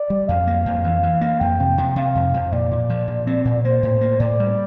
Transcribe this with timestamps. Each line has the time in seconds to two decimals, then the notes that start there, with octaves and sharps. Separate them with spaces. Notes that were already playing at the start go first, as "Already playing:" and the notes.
Already playing: D5
0.10 G3
0.28 F2 F5
0.47 A#3
0.66 F2
0.84 E3
1.03 E3
1.21 A#3
1.40 F2 G5
1.60 C3
1.78 C3
1.96 C3 F5
2.15 F2
2.34 F2
2.52 A#2 D5
2.71 A#2
2.90 F3
3.08 A#2
3.27 C4
3.45 A#2
3.64 A#3 C5
3.83 A2
4.01 A#3
4.20 A2 D5
4.39 G3